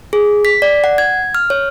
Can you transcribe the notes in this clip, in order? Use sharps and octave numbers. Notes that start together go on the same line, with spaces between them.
G#4
B6
D5
F#5
G#6
F6
C#5